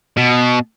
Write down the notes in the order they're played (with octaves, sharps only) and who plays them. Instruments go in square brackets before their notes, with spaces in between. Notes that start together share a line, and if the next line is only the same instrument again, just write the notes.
[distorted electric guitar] B2